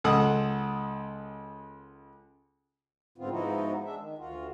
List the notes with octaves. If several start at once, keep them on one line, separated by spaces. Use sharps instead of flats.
C#2 A4 F#5 D#6
G#2 D3 B3 C4 F4
G#2 F3 B3 D#4 E4 F#4
G#3 D4 E5
D#3
D2 F4 F#4